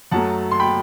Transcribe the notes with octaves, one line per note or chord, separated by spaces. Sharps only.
F#2 F#3 A3 F#5 A5
C6
G5 B5